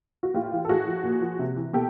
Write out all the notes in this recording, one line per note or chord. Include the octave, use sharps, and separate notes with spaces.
F#4
A2 F4 G4
E3
A4
A2 F#4 G#4
F3
A#2
F3
C3
E3
B2 G4 A4